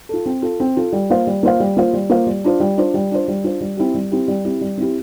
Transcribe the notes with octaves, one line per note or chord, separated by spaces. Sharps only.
F4 A4
C4
F4 A4
C4
F4 A4
G3
A#3 F4 C5 F5
G3
A#3 F4 C5 F5
G3
A#3 F4 C5 F5
G3
A#3 F4 C5 F5
G3
D4 F4 C5
G3
D4 F4 C5
G3
D4 F4 C5
G3
D4 F4 C5
G3
C4 E4 G4
G3
C4 E4 G4
G3
C4 E4 G4
G3
C4 E4 G4